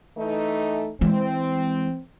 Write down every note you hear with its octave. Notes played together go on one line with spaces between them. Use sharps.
E3 A3 D#4
E3 G#3 C4